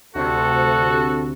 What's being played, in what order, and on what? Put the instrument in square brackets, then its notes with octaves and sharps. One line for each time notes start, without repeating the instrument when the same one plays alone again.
[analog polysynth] D2 C3 [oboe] F#4 [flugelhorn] A4